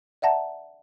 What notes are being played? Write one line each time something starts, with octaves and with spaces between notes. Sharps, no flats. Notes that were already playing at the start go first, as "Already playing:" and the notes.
D5 E5 F#5 A5 A#5